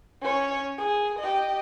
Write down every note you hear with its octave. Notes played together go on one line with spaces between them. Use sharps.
C#4 C#5
G#4
G4 D#5